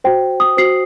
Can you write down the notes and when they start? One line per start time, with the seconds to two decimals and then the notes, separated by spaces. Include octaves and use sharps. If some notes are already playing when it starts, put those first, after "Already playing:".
0.04 F#4 C5 G5
0.40 D#6
0.57 F#4 C5 C7